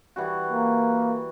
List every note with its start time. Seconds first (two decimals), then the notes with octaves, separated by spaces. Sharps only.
0.16 E3 G3 F#4
0.52 A#3